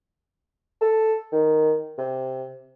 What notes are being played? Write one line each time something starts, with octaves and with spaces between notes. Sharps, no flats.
A4
D#3
C3